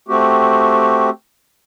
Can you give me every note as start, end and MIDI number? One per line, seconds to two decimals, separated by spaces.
0.08 1.10 57
0.08 1.10 60
0.08 1.10 66
0.08 1.10 67